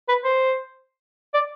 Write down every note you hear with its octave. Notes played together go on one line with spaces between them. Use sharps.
B4
C5
D5